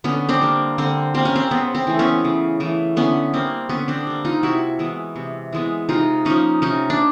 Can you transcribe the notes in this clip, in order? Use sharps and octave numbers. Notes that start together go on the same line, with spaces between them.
D3 B3 C#4
C4 D4
G3 A#3
D3 C4
G3 A#3 C4
C#4
C4
C#3 B3
C4
E3 A3
B3 C#4
C#3
E3 A3
D3 B3 C#4
G3 A#3 C4
D3 B3 C#4
C4 D4
G3 A#3
D#4 F4
C3 E4 F#4
E3 G#3 B3
C3
E3 G#3 B3
C3 D#4 F4
F3 A#3 C#4 D#4
C3 C#4 D#4
D4